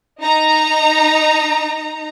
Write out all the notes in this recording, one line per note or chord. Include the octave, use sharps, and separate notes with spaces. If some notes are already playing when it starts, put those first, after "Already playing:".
D#4 A#5